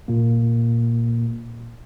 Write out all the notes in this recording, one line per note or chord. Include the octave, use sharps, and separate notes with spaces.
A#2 A#3